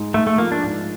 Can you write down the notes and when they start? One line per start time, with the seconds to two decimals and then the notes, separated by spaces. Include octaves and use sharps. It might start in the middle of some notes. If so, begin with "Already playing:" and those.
Already playing: G#2 G#3
0.14 G#2 A3
0.27 A3
0.38 F3 A#3
0.52 D4
0.63 G#2